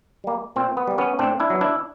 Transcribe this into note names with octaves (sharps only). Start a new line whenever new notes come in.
G3 A#3
A#2 C4
B3
G3 A#3
B3 C#4
A2 C4 D4
D4 E4
F#3 B3
D4 E4